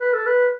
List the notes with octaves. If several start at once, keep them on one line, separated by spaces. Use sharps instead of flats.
B4
A4
B4